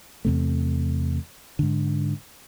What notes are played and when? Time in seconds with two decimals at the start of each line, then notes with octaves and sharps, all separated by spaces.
0.25 E2 C3 A3
1.59 G#2 D3